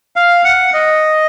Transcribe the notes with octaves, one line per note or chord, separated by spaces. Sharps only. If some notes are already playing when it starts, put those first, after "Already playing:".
F5
F#5
D#5